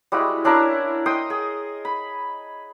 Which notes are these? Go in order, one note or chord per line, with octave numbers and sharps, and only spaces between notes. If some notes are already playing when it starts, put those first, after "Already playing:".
G3 G#3 E4 F#4
C#4 D4 E4 A#4
D#5 G5 C6 D#6
G#4
B5